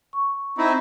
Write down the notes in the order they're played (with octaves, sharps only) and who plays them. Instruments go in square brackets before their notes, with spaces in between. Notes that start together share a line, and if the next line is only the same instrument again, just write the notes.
[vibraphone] C#6
[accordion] C4 D#4 E4